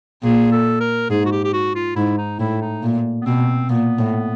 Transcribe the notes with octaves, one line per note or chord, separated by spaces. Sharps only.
A#2 G#4
A4
A#4
G#2 G#4
F#4
G4
G4
F#4
F4
G#2 E4
D#4
A2 E4
D#4
A#2
B3
B2 C4
A#2 B3
A2